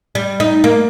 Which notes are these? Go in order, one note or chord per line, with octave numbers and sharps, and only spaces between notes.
G3
D#4
A#3